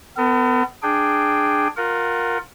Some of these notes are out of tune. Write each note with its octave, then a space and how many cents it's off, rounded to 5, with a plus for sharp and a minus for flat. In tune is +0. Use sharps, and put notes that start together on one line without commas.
B3 +30 A#4 -45
D4 +10 G#4 +5 G5 +0
F4 +25 A#4 +0 F#5 +25